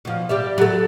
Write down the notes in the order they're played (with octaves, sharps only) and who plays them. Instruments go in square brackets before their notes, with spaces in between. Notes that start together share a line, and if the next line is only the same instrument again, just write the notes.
[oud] B2 F3
G3 G4 E5
F#3 A4